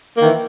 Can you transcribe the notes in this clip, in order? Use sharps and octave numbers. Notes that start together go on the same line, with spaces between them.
D#3 E3 A#3